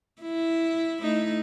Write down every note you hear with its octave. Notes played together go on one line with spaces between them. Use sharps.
E4
A3 D#4 E4